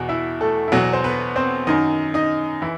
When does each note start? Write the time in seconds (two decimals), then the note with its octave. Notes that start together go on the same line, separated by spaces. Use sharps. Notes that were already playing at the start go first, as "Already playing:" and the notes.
Already playing: E2 B2 F#4
0.09 E4 E5
0.41 A3 A4
0.68 E4
0.72 E2 B2 F#3 F#4
0.93 C5
1.04 B3 B4
1.35 C4 C5
1.67 F#2 D#3 D#4 D#5
2.14 D#4 D#5
2.62 E3 E4